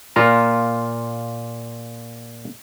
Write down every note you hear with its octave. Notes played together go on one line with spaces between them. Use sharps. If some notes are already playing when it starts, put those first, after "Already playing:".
A#2 F4 A#5